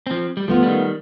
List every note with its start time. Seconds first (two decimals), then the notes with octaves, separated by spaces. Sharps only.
0.07 F3 C4
0.37 G3
0.48 F3 A3 B3 F4
0.63 D#3 G3